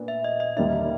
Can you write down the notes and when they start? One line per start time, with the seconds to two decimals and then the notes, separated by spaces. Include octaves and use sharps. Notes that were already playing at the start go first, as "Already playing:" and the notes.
Already playing: A#2 B3 D4
0.08 E5
0.24 D#5
0.40 D#5
0.56 D#2 D3 G3 A#3 D4 E5